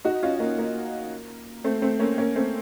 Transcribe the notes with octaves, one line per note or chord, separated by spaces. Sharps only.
D#4 F#4
C#4 F4
A#3 C#4
A#3
A3 C4
A3 C4
A#3 C#4
A#3 C#4
A3 C4